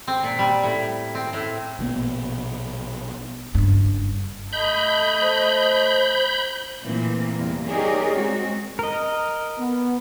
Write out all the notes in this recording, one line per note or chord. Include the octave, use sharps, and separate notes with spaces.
C4
A#2
G3
A2
C4
A2
A#1 B2 A#3 B3
F#1 G2
A3 D#5 B5 G6
C5
A#2 E3 A3 A#3 C4
E2 C3 G3 A#3
D#4 G4 G#4 A#4 C#5 D5
G#3 C4 F#4
A#4 D#5
B3